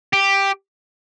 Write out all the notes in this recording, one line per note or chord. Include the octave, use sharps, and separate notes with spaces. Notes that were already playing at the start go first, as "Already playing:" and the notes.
G4